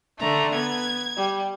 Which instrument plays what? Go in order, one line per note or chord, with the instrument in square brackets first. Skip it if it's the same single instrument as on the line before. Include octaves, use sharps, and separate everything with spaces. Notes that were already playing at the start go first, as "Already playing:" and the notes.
[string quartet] D3 A3 [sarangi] A#5
[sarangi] B3 [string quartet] G#6
[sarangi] G3